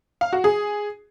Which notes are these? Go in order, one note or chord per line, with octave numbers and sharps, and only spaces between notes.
F5
F#4
G#4